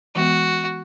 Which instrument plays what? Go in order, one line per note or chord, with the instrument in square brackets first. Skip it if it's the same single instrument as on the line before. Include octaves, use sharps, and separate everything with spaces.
[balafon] E3 G#3 B3 [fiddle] F#4